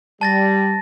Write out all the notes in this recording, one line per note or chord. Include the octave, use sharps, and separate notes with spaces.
G3 A5 A6 A#6